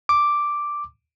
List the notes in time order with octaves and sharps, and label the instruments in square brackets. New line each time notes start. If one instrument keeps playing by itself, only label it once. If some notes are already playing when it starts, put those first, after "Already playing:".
[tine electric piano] D6